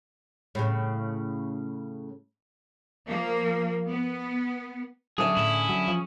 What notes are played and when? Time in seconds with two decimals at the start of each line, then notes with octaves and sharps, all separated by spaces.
0.55 A2 C#3
3.08 F3 A#3
3.90 B3
5.18 D3 F#3 C#4 G#4 E5
5.37 A2 E4
5.69 F#3
5.88 F3